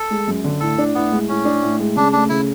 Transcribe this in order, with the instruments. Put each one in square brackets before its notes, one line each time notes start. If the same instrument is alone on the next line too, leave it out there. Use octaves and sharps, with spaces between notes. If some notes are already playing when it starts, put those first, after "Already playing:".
Already playing: [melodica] A4
[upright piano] G#3
F#2
D3
[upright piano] A2 [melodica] A4
[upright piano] D4
[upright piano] A2 [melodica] B3
[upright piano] G#3
[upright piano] A2 [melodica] C#4
[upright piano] D4
A2
G#3
[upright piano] C#3 [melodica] D4
[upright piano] A3 [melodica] D4
[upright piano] C#3 [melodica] E4